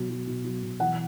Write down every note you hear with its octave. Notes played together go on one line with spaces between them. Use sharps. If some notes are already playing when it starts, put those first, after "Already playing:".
Already playing: B2 F#3
F#3
B2
F#3
B2
E3 F#5